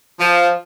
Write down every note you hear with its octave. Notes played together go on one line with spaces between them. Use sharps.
F3